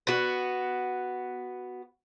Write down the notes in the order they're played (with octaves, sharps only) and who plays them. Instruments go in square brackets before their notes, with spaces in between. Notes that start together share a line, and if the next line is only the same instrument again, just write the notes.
[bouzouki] B3 F#4